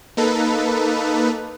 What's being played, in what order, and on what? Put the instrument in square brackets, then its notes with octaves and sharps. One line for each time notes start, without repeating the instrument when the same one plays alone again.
[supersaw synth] A#3 D#4 A4 B4